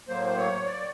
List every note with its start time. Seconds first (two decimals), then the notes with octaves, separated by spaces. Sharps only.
0.08 A2 F#3 A#3 C5
0.26 C5
0.37 C#5
0.66 D5